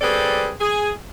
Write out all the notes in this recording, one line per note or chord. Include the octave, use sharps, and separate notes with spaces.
G3 C4 G#4 A4 B4 D5
G#4